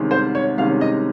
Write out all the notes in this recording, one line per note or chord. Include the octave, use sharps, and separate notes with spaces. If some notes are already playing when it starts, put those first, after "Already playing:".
Already playing: C2 C3 D#3 G#3 C#4
C5
C#5
C2 C3 D#3 G#3 C#4 F5
D#5